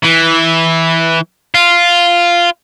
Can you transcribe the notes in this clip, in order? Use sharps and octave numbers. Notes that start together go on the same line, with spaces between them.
E3
F4